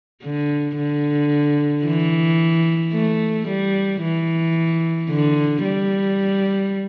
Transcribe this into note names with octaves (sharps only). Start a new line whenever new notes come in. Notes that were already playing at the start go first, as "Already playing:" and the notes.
D3
D3
E3
A3
G3
E3
D3
G3